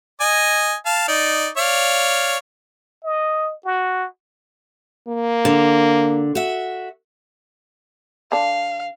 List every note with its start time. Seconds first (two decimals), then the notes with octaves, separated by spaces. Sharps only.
0.21 D#5 G#5
0.86 F5 A5
1.08 D#4 D5
1.57 C#5 D5 F5
3.04 D#5
3.65 F#4
5.08 A#3
5.45 D3
6.35 F#4 E5
8.32 D3 D4 F5